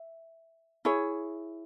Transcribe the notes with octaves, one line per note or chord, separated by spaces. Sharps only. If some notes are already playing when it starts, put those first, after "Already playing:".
Already playing: E5
E4 G#4 C#5